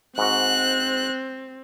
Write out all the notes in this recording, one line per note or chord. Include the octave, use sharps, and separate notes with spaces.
G#2 C4 F#4 F#6